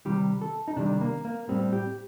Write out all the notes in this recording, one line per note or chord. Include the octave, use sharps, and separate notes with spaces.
C3 D#3 G3 G4
A4
D#4
C3 D#3 G3 D4
A#3
A#3
A2 G3 C4
G4